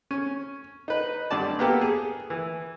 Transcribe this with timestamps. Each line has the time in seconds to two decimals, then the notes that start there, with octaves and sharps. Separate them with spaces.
0.11 C#4
0.88 D#4 B4
1.31 G2 D3 D5 A5
1.59 A#3 B3 G4 A4
1.81 G#4
2.30 E3